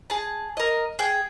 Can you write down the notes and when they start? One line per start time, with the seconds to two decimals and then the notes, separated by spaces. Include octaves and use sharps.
0.10 G#4 A5
0.57 A#4 D#5
0.99 G#4 G5